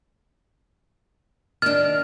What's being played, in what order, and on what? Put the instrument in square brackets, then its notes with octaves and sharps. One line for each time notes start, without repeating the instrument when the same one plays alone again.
[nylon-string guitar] D#3 D4 [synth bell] F6